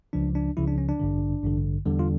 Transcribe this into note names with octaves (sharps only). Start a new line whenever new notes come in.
C#2 C#3 F3 D4
D4
C#2 C#3 F3 E4
D4
C#4
D4
A1 G2 D3
A1 G2 D3
E2 D3 G3
F4